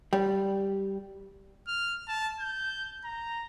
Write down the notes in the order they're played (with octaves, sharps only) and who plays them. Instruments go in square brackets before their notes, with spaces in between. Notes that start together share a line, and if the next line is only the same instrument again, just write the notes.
[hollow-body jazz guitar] G3
[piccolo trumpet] F6
A5
G6
A#5